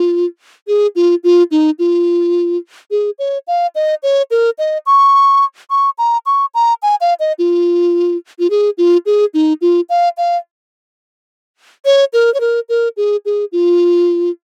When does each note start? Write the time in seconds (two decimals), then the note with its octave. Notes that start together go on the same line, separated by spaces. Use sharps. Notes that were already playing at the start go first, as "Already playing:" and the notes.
Already playing: F4
0.68 G#4
0.96 F4
1.24 F4
1.51 D#4
1.79 F4
2.91 G#4
3.19 C#5
3.47 F5
3.75 D#5
4.03 C#5
4.31 A#4
4.58 D#5
4.86 C#6
5.70 C#6
5.98 A#5
6.26 C#6
6.54 A#5
6.83 G#5
7.01 F5
7.20 D#5
7.39 F4
8.39 F4
8.50 G#4
8.78 F4
9.06 G#4
9.34 D#4
9.61 F4
9.89 F5
10.17 F5
11.85 C#5
12.13 A#4
12.34 C#5
12.40 A#4
12.69 A#4
12.97 G#4
13.25 G#4
13.52 F4